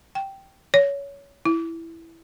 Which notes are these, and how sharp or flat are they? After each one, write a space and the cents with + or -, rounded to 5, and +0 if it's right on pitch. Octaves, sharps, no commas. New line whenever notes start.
G5 -10
C#5 +20
E4 +5